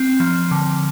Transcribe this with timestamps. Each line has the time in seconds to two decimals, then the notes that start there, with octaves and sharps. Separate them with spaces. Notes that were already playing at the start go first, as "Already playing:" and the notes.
Already playing: C4
0.20 F3
0.51 D3